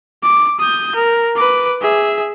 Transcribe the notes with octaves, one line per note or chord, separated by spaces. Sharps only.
D6
D#6 G6
A#4
B4 D6
G#4 E5